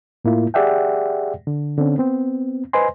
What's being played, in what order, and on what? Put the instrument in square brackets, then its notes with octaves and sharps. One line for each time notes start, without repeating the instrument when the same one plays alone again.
[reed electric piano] A2 A#3 E4 F4
G4 G#4 D5 E5 F#5 G5
D3
D3 C4 C#4
B3 C4
B4 C5 D#5 G#5 C6